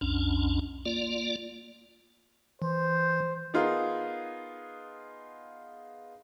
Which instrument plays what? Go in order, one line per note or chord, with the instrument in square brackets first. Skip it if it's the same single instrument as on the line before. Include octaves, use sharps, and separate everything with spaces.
[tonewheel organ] B1 F2 C#4 D4
A#3 F4 D5
[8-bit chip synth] E3 [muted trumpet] C5
[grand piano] B3 D#4 F4 G#4 A#4